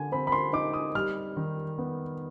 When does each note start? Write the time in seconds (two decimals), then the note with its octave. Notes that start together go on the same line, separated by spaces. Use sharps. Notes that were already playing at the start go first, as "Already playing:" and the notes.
Already playing: D3 G#5
0.12 C4 B5
0.27 B5
0.32 C6
0.53 D#4 D6
0.73 D#6
0.95 G3 F6
1.37 D#3
1.78 B3